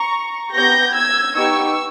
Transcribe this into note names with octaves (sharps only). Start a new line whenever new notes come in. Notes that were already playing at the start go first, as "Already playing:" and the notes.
Already playing: A#5 C#6
B3 G4 G6 A#6
E6 G#6
B3 D#4 G4 C#6 E6